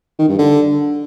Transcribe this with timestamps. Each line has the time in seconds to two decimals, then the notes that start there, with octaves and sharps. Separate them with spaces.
0.19 D#3
0.29 G2
0.38 D3